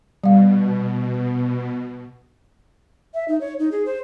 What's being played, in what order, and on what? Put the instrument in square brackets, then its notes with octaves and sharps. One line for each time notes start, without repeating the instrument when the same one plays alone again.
[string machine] B2 [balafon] G3 F5
[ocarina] E5
D#4
C#5
D#4
G#4
C5